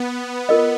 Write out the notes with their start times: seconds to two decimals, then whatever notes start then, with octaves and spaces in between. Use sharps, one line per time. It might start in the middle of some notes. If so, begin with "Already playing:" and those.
Already playing: B3
0.49 F4 A#4 D#5